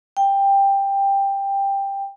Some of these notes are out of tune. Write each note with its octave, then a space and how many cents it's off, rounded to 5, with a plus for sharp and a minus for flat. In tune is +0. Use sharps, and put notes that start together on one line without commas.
G5 +10